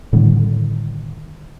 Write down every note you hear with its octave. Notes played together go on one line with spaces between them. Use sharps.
A2 D3 D#3 G3